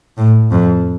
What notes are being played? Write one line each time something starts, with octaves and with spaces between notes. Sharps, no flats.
A2
F2